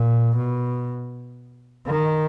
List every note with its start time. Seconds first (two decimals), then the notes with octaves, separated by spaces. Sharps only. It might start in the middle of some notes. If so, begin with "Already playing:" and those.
Already playing: A#2
0.37 B2
1.88 D#3